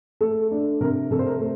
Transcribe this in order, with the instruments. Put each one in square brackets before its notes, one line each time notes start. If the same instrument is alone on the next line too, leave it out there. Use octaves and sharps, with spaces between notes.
[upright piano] A3 A4
D4
C3 A#4
C3 A4
C5
A#4
A3